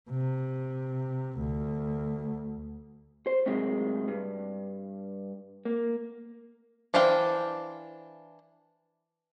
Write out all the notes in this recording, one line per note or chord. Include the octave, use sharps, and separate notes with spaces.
C3
D2
C5
A2 C3 D#3 F#3 G#3
G2
A#3
E3 D4 C5 F5 G5